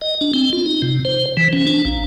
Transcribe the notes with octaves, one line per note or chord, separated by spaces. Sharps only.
D#5
D4
C4
F4
D#4
C3
C5
E3
C#4
D4
A#1